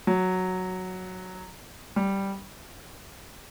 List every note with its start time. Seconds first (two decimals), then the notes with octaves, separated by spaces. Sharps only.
0.07 F#3
1.96 G3